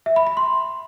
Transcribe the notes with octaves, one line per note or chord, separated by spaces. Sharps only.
E5
B5
B5
C6